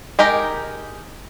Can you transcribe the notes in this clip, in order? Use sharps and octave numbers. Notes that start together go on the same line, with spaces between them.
G#3 D#4 G4 A#4